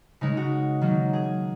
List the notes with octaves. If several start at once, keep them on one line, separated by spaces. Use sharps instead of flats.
C#3 G#3 D#4
F#4
D#3 F#3 A#3
G#4